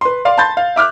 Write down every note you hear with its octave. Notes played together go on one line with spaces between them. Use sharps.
B4 C6
D5 F5 C6
A5 B5 C6 G6 A6
F5
E5 D6 F6 F#6